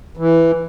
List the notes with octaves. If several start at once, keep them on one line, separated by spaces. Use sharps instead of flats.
E3